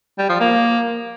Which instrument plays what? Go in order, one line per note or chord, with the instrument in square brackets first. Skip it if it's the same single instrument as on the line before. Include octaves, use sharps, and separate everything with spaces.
[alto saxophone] G3
F3
A#3